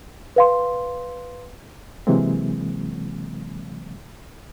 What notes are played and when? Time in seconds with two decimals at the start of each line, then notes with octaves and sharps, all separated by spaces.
0.36 B4 F5 C6
2.07 C3 E3 F#3 G#3 A#3 C4